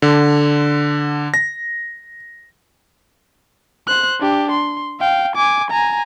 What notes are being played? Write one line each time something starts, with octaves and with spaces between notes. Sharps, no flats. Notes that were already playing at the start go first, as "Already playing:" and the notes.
D3
A#6
C5 F#6
D4 G4
C6
F5 G5
G#5 D6
G#5 A#5